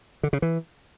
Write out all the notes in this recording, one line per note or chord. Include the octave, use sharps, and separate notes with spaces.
D3
C#3
E3